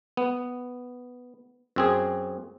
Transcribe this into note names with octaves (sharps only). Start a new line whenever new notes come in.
B3
F#2 C4 G#4